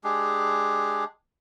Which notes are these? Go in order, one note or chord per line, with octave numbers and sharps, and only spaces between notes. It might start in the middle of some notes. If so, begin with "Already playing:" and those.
G#3 D4 G4 G#4